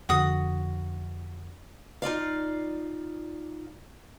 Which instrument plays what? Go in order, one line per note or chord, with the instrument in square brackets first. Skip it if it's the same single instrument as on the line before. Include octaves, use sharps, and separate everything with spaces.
[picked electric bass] F2 D3 [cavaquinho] F#4 D#6
[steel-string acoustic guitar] D#4 F4 D5 F5